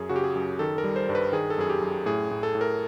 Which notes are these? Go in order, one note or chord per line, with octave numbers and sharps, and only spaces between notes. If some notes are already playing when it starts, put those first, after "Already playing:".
Already playing: F#2 G#4
C#3 F#4
G4
G#4
F#2
D#3 A4
A#4
G3
C5
G2
B4
D#3 G#4
A4
F#2 G#4
G4
F#2
A2 G#4
A2
A4
A2
A#4